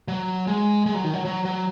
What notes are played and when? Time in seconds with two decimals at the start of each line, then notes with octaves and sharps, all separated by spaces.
0.08 F#3
0.47 G#3
0.86 G#3
0.95 F#3
1.04 D#3
1.14 F#3
1.25 F#3
1.45 F#3